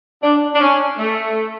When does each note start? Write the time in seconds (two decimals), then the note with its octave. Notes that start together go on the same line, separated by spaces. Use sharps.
0.22 D4
0.54 D4
0.60 C#4
0.98 A3